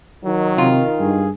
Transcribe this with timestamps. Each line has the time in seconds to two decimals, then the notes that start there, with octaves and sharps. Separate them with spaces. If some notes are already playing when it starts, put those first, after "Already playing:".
0.24 D#3 F#3
0.58 C3 F4
1.00 G2 G#4